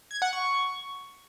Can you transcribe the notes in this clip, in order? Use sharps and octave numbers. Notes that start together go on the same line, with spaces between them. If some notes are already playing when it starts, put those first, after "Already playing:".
G#6
F#5
C#6